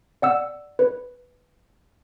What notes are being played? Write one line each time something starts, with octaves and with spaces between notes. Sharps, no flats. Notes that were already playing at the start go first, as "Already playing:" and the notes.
D5 F#5 E6
B4